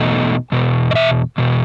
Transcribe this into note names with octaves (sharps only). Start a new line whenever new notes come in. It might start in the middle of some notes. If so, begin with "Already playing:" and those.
Already playing: E2 B2 A3 D#4
E2 B2
D#5
E5
E2 B2